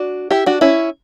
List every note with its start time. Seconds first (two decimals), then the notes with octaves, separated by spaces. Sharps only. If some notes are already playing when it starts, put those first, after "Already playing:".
Already playing: D4 F#4
0.31 E4 G4
0.46 D4 F#4
0.61 C#4 E4